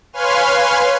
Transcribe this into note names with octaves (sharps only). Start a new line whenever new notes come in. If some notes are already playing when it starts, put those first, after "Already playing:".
B4 C#5 F5 G#5 C6 F6